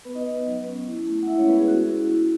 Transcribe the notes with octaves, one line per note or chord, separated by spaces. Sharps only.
B3 B4
D#4 D#5
B3
F#3
C#4
E4
A3
F#5
G#3 E4 E5
C#4 C#5
G#3 B3 B4
G#4
C#4 F#4
E4
E4